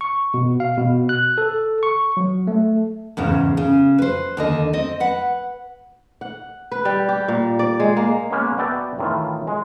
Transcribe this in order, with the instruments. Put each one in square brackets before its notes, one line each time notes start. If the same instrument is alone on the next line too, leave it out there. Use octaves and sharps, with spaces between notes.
[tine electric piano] C#6
B2
F5
B2
F#6
A4
C#6
F#3
A3
[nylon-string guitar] E2 G#2 C#3
C#3
B4 C5
D#2 D3 D#5
C4 D#5
B4 F#5
[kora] F#5
B4
G3
G4
A#2
D5
G#3
A#3
[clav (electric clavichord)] G#3 A#3 B3 C#4
B3 F#4 D5 E5 G5 A5
A2 D#3 E3 F4
G#3